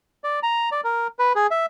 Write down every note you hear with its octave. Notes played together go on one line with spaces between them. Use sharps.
D5
A#5
D5
A#4
B4
G#4
E5